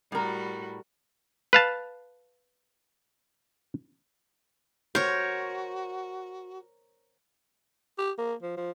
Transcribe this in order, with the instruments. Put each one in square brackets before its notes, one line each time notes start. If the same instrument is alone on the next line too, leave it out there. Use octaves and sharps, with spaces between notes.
[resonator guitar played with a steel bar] A2 A#4 [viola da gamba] G3 F#4
[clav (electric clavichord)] B4 F5 A5
[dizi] F#4 [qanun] A#4 C#5 [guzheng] C5
[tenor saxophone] G4
A#3
F3
F3